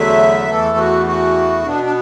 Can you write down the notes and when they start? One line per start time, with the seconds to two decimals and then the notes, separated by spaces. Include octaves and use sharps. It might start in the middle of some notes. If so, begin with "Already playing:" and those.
Already playing: E2 D3 F#3 A3 E5
0.48 E2 E3 A3 A4
0.77 F#4
1.06 F#4
1.64 B2 B3 D4
1.84 D4